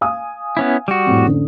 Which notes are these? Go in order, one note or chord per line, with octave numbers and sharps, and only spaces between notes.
F5 G#5 D#6
B3 C#4 E4
G3 F#4
F2 A2
A1 D3